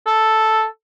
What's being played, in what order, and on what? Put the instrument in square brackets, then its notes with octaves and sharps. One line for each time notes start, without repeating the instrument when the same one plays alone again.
[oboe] A4